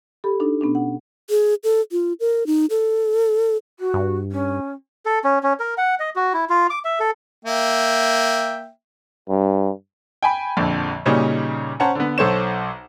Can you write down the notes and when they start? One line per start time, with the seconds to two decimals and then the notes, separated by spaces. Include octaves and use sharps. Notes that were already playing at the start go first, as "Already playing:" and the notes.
0.24 G4 A4 B5
0.40 D4 D#4 A4
0.61 B2 B3 C#4 D4
0.75 F#5
1.30 G#4
1.64 A4
1.92 F4
2.20 A#4
2.47 D#4
2.70 A4
3.79 F#4
3.94 G2
4.31 C#4
5.06 A4
5.24 C#4
5.43 C#4
5.60 A#4
5.78 F#5
6.00 D#5
6.16 F#4
6.34 E4
6.50 F4
6.70 D6
6.85 E5
7.00 A4
7.45 A#3 E5 G5
9.29 G2
10.23 G5 G#5 B5
10.57 A#1 F2 D3
11.06 A#2 C#3 G3 C#4 D#4 F#4
11.80 C#4 C5 F#5 A5 A#5
11.95 D3 B3
12.18 B1 A4 C5 C#5 E7